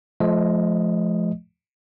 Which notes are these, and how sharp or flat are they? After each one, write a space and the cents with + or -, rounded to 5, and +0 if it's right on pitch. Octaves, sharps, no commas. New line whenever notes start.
F3 +0 A3 -40 D#5 +0